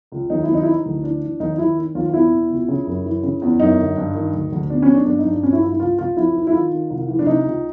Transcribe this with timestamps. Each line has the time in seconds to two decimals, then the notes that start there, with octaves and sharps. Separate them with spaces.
0.12 C#2
0.30 D#2 D#4
0.43 E4
0.49 D#2
0.54 D#4
0.63 E4
0.67 E3 D#4
0.85 D2
1.03 E3 D4
1.21 E3
1.40 D#2 D#4
1.54 D#4
1.58 D#2 E4
1.77 D#3
1.95 D#2 F4
2.06 F4
2.13 E2 E4
2.32 B2
2.50 C#2
2.68 C#3
2.86 F#2
3.05 E3
3.23 C#3
3.42 E2
3.60 F#2 D#4
3.78 D3
3.97 G2
4.15 D#3
4.33 D2
4.52 D2
4.70 B2 D4
4.82 C#4
4.88 B2
4.95 D4
5.06 G2 D4
5.19 D#4
5.25 G2
5.31 D4
5.43 G2 C#4
5.52 E4
5.61 G2 F4
5.70 E4
5.80 C#2 F4
5.98 C#2 F4
6.17 F2 E4
6.35 E3
6.47 E4
6.53 D#3 F4
6.71 D#3
6.90 C2
7.08 E3
7.19 D4
7.26 C3 D#4
7.45 C#2